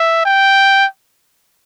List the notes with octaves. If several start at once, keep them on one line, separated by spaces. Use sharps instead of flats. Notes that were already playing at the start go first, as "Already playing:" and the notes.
Already playing: E5
G5